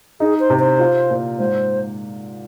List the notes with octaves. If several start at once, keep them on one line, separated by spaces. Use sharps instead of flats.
D#4 G#4
C5
C3
C5
F4
A#2
G#2 C5